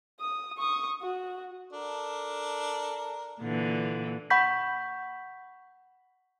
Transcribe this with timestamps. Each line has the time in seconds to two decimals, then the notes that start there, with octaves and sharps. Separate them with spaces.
0.20 D#6
0.58 C#6 D#6
1.02 F#4
1.73 D4 A4 A#4
3.40 A#2 D3 E3
4.30 F#5 B5 C#6 G6 B6